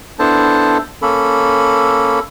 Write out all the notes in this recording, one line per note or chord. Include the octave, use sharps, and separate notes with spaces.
B3 D4 E4 A4 C5 A5
A#3 C#4 A4 B5